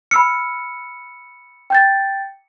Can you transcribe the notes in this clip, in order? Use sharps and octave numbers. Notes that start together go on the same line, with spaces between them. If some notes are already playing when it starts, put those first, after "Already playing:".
B5 E6 F6 C#7
G5 G6 A6